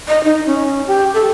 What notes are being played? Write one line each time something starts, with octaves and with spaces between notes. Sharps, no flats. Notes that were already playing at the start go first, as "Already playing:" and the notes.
D#5
D#4
C#4
G4
A4